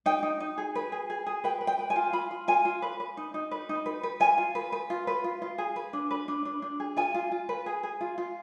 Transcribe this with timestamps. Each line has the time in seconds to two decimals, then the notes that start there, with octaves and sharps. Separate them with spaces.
0.06 D#4 G5
0.23 D#4
0.40 D#4
0.58 G#4
0.75 B4
0.92 G#4
1.10 G#4
1.27 G#4
1.44 B4 G5
1.61 B4
1.67 G5
1.79 B4
1.90 G#5
1.96 F4
2.13 F4 B5
2.31 F4
2.48 F4 G#5
2.65 F4
2.82 B4
3.00 B4
3.17 D#4
3.34 D#4
3.51 B4
3.69 D#4
3.86 B4
4.03 B4
4.20 F4 G#5
4.38 F4
4.55 B4
4.72 B4
4.90 F4
5.07 B4
5.24 F4
5.42 F4
5.58 G#4
5.76 B4
5.93 D4
6.11 B4
6.28 D4
6.45 D4
6.62 D4
6.80 G#4
6.97 F4 G#5
7.14 F4
7.32 F4
7.49 B4
7.66 G#4
7.83 G#4
8.01 F4
8.18 F4